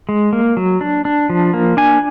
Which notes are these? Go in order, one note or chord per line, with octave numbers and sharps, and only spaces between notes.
G#3
A#3
F#3
D4
D4
F3
A#3
D4 G#5